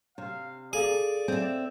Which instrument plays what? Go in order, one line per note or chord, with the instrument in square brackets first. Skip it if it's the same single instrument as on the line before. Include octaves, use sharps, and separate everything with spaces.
[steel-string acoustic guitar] C3 [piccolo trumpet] F5
[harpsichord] G#4 [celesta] A4 F5 [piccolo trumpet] D5
[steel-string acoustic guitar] C4 E5